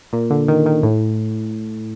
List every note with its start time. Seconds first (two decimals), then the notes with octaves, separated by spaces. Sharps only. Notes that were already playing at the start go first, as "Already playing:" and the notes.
0.13 A#2
0.30 D3
0.48 D#3
0.66 D#3
0.83 A2